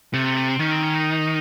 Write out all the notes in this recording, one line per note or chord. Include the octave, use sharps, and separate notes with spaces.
C3 A3
A3
A3
C4
D#3 C#4
C4
C#4
D#4